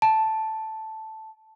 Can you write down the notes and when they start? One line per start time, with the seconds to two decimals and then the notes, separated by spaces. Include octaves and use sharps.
0.02 A5